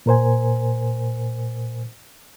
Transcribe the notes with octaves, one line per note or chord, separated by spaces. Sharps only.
A#2 A#4 C5 G#5